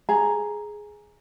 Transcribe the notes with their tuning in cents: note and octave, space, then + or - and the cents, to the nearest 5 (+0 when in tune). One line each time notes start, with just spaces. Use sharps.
G#4 +5 A#5 +0